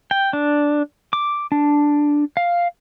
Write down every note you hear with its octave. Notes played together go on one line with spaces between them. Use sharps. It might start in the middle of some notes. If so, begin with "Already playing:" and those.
G5
D4
D6
D4
F5